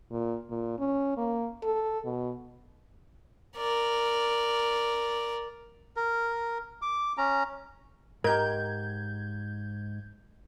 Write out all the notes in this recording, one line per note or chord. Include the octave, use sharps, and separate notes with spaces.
A#2
A#2
C#4
A#3
A4
B2
A#4 D5
A#4
D6
C#4 A#5
G#2 G4 A#4 D#5 A#5 G6 G#6